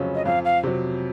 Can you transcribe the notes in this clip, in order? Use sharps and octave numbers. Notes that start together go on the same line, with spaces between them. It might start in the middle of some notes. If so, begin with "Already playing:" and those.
Already playing: F1 F2 C#3 F#3 C#4
D#5
F2 F5
F5
C3 F#3